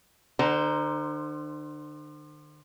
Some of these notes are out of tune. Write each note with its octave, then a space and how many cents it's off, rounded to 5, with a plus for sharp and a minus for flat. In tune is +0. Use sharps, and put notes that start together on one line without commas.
D3 +40 C5 +0 A#5 +0